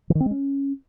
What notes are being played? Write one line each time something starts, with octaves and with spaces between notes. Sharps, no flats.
E3
D#3
C4
G#3
C#4